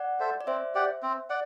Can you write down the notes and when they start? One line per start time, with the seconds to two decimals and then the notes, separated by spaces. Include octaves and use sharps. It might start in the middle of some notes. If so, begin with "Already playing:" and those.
Already playing: D5 F#5
0.20 A4 C5 E5
0.41 D5
0.47 C4 C5 E5
0.75 G4 D5 F#5
1.03 C4
1.30 D5 F#5